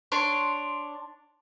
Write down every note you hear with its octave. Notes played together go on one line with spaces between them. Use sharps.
D4 C#5 C6